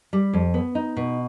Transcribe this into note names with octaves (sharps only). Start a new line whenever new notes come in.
G3
F2
B3
D#4
B2